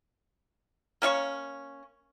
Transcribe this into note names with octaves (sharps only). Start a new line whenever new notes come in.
A#3 C#4 E5 C#6